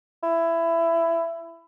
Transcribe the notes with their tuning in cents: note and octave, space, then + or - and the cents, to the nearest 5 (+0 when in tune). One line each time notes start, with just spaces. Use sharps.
E4 +15